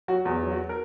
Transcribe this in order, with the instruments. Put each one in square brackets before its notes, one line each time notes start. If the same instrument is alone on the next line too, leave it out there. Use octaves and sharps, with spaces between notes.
[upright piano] F#3 F#4
E2 F#4
F#3
F#4
A#4